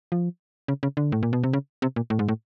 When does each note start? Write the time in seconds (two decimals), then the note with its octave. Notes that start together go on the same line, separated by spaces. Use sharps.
0.12 F3
0.68 C#3
0.83 C#3
0.97 D3
1.12 A2
1.23 A#2
1.33 B2
1.43 C3
1.53 C#3
1.82 C3
1.96 A#2
2.10 A2
2.19 G#2
2.28 A2